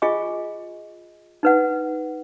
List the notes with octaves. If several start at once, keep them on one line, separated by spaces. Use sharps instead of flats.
F4 G#4 D#5 G#5 C#6
D#4 B4 F#5